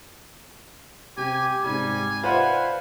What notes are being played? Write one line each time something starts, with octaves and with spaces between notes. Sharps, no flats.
C3 G4 G#5
G#2 C3 G3 G#5
F4 B4 C5 D5 E5 F#5